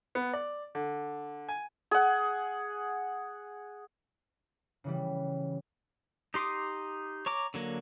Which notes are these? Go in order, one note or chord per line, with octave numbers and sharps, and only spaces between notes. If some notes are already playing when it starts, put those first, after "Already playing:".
B3
D5
D3
G#5
G#4 F#5
C#3 E3 G3
D#4 G4 C6 D6 D#6
C#5 A#5 D6
D3 F#3 A#3